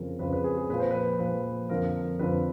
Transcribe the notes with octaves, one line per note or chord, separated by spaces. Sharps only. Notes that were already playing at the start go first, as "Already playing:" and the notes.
Already playing: F2 C#3 F3 A#4
F2 C#3 F3 B4
B4
G#4
G#4
A#2 F3 B4
C5
B4
A#2 F3 B4
F2 D3 F3 A#4
F2 D3 F3 B4